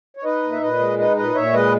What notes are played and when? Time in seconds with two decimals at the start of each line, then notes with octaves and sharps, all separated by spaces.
0.17 C#5
0.24 D#4 B4 D#5
0.43 A#2
0.52 E5
0.61 A#2 B4 D#5
0.79 G#3
0.98 D#4 B4 D#5
1.17 A#2 B4 D#5
1.35 A#2 C#5 E5
1.53 G#3 B4 D#5